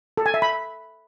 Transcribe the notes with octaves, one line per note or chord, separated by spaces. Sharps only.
A4
G#5
E5
B5